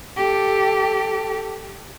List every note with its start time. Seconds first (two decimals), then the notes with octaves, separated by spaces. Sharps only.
0.16 G4 A4